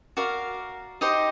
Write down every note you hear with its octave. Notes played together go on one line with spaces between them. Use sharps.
F#4 A#4 D5 F5
D#4 G4 C5 D#5